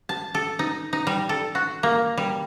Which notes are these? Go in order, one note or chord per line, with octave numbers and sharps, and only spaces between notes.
A5
A4
D#4
D#4
G3
A4
F#4
A#3
G3